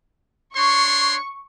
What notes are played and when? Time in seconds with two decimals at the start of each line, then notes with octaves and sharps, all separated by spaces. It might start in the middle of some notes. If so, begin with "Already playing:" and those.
0.56 D4 C#5 C6 C#6